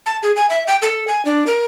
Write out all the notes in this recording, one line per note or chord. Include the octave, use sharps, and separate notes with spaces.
A5
G#4
G#5
E5
G5
A4
G#5
D4
A#4